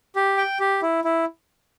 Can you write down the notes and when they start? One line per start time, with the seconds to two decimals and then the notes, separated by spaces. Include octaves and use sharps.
0.16 G4
0.37 G5
0.60 G4
0.82 E4
1.04 E4